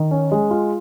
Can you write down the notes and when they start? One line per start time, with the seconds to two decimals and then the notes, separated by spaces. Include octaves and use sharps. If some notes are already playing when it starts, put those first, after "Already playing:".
Already playing: D#3
0.11 C#4
0.32 G#3
0.51 F4